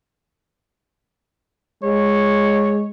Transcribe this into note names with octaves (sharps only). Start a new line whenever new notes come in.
G#3 C#5